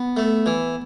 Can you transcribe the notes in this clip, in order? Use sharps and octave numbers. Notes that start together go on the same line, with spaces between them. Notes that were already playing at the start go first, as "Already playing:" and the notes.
Already playing: B3
A3
E3